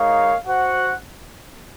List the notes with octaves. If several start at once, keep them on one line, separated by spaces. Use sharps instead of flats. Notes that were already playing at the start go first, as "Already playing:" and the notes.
Already playing: G#3 D#4 A#4 C#5 F5
F#4 C5 F#5